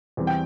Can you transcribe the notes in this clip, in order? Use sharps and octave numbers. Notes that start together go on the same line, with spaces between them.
E2 E3 G3 C4
G5